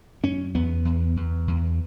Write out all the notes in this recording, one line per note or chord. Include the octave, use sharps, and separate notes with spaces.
F#2 C#4
E2 B3
E2
E2
E2